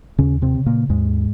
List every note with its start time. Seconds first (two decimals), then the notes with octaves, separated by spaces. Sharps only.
0.18 D#2 C#3 C#4
0.42 C3 C4
0.55 C#3
0.66 A#2 A#3
0.89 D#2 G#2 G#3